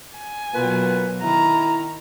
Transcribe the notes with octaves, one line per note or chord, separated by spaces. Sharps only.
G#5
B2 F#3 A#3 F4 B4
D#3 E4 A#5